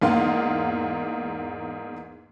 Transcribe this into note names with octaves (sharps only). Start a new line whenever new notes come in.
E2 G#2 A#3 F5 F#5 C6